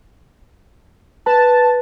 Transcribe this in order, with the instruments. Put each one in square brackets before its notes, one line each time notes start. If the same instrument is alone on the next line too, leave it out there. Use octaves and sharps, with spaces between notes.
[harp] B4 [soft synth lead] A5